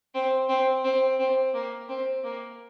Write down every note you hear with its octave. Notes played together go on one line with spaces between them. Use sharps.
C4
C4
C4
C4
A#3
C4
A#3